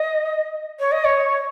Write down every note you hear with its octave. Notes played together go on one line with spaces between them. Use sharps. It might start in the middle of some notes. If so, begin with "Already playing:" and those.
Already playing: D#5
C#5
D#5
C#5